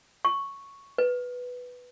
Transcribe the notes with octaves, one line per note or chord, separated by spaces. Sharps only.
C#6
B4